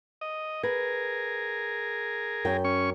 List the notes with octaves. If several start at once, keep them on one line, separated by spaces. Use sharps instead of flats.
D#5
G#4 A#4 B4
F#2 G5
C#4 C#6